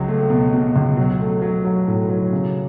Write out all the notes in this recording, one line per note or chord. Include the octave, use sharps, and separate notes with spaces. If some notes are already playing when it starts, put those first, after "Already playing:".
Already playing: C#2 F#3
A3
B2
B2
C#2
F#3
A3
F#3
F#3
A2
F#3
C#3